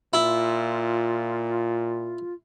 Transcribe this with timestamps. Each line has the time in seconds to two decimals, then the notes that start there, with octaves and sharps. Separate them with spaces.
0.13 A#2 E4 F4